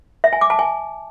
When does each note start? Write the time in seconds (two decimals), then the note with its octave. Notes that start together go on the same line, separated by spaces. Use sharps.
0.24 E5
0.33 G#5
0.41 D6
0.50 A5
0.59 G#5